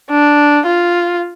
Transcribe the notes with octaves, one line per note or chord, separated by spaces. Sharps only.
D4
F4